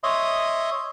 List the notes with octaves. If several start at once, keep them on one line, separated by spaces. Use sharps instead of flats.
C#5 D#5 E5 C6 D#6